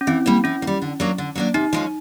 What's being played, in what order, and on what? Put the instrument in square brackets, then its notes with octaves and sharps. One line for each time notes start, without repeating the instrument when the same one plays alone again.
[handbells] C#4
[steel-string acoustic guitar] E3 [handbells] C4
[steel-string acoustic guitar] G3 A#3
[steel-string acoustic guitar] E3 [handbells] C#4
[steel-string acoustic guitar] A#3
G3
D3
F#3 A#3 D4
D3
F#3 A#3 D4
[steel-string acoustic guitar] C3 [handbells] D#4
[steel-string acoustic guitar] F3 G#3 C#4